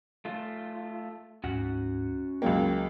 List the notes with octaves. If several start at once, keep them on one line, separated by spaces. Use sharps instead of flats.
A3 F4
D2 G#2 C#4 F#4 F#5
C#2 F#3 A#3 G5